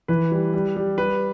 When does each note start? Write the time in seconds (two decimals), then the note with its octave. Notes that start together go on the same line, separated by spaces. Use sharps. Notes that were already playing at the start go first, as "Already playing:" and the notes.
0.08 E3 B4
0.32 G3
0.54 G3
0.77 G3
0.98 G3 B4